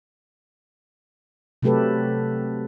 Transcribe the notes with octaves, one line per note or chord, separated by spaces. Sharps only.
C3 F#3 A3 G4 A4 B4